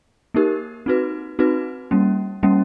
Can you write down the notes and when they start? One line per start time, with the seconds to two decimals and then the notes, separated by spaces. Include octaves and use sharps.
0.34 A#3 D#4 G4 A#4
0.86 C4 D#4 F#4 B4
1.39 C4 D#4 F#4 B4
1.91 G3 A#3 C#4
2.43 G3 A#3 C#4